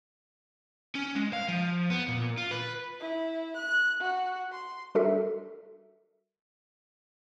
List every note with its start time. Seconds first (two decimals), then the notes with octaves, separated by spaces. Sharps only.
0.95 C#4
1.16 G#3
1.33 F5
1.48 F3
1.90 B3
2.08 A#2
2.37 F4
2.51 B4
3.00 E4
3.57 F#6
4.00 F#4
4.52 C6
4.95 G3 D4 F#4 A4 A#4 E5